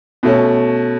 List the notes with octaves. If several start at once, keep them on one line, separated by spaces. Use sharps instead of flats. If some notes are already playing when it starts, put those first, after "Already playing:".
B2 A3 C#4